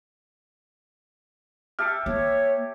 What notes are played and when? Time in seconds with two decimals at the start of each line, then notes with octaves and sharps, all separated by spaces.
1.79 G4 E5 A5 F6 C#7
2.06 A#3 C#5